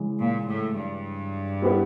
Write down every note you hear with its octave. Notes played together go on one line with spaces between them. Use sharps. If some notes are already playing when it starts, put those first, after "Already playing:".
Already playing: C#3 E3 G#3
A#2
A2
G2
G3 B3 E4 G4 B4